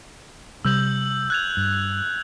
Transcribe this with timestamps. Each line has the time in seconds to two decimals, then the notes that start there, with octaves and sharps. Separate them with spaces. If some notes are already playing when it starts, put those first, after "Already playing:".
0.65 C3 G3 E6 G6 F#7
1.30 F#6 G#6 F7
1.57 G2